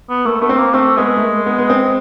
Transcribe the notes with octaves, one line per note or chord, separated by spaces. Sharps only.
B3
A3 A#3
A3 B3
C4
A#3
A3 C4
G#3 B3
A3
A#3
B3
B3
C4